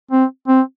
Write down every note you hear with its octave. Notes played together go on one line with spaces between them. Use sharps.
C4
C4